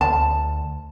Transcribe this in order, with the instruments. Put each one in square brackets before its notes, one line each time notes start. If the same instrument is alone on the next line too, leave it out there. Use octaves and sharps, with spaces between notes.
[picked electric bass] D2 [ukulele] A5